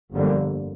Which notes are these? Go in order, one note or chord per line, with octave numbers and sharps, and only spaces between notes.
G1 F2 D3 G3 A#3